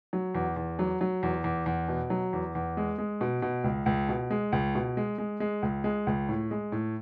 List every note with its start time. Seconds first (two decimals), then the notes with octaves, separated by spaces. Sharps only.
0.13 F#3
0.35 E2
0.56 E2
0.79 F#3
1.01 F#3
1.23 E2
1.44 E2
1.66 E2
1.89 B2
2.10 F#3
2.33 E2
2.55 E2
2.77 G#3
2.98 G#3
3.21 B2
3.42 B2
3.64 C#2
3.86 C#2
4.09 B2
4.31 G#3
4.52 C#2
4.75 B2
4.97 G#3
5.18 G#3
5.40 G#3
5.63 C#2
5.84 G#3
6.07 C#2
6.29 A2
6.51 G#3
6.72 A2